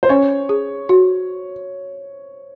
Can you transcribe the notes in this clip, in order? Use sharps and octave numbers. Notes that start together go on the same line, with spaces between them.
C5
C#4 C#5
G#4
F#4